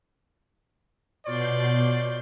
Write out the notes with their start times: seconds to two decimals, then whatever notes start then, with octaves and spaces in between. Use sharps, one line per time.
1.26 B2 F4 C#5 D5 G6 C7